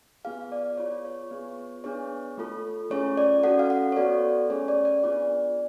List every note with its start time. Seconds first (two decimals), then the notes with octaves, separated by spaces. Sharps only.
0.25 B3 F4 G#4 F5
0.52 D5
0.78 B3 F4 G#4 C#5
1.05 C#5
1.31 B3 F4 G#4
1.84 B3 D4 G#4 C#5
2.38 A3 F4 A4
2.90 A3 C#4 F4 G#4 C#5
3.18 D5
3.44 C#4 F#4 A4 F#5
3.59 F5
3.70 F#5
3.92 C#5
3.96 B3 F#4 A4 D5
4.50 A3 C#4 G#4 C#5
4.68 D5
4.85 D5
5.03 B3 D4 F4 G#4 D5